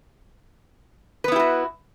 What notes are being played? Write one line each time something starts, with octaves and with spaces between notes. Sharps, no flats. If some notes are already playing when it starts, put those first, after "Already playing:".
B3 E4 F#4 G4 B4